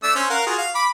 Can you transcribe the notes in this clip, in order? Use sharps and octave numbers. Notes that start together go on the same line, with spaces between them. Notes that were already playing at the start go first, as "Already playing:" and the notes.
A3 D4 E6
C#4 C5
A#4 F5 F#5
F4 F#4 G#4
F5
B5 D6